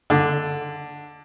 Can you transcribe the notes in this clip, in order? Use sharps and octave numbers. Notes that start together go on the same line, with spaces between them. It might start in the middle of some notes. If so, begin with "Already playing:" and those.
D3